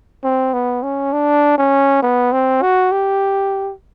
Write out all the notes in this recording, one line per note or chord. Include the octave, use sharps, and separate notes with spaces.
C4
B3
C#4
D4
C#4
B3
C4
F#4
G4